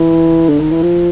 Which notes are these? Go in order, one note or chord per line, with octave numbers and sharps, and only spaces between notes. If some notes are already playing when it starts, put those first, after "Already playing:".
Already playing: E3
D3
D#3
E3
F3